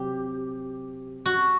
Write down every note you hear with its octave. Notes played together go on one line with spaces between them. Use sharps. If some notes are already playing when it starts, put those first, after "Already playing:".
Already playing: C3 F#3 G4
F#4